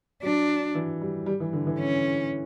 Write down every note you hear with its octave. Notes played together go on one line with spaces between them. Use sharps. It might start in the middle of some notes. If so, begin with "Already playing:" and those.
F#3 D4
E3
G3
G3
E3
D3
E3
C#4